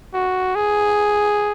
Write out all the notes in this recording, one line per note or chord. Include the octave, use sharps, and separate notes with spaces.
F#4
G#4